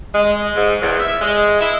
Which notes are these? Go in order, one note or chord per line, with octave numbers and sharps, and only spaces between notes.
G#3
G#2
E2
E5
G#3
E4